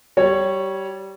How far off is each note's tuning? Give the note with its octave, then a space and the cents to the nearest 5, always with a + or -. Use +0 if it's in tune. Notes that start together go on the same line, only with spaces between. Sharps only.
G3 -20 C#5 -5